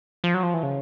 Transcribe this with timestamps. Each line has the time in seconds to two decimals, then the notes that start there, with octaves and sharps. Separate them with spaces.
0.24 F3
0.34 F#3
0.43 F3
0.54 E3
0.63 C#3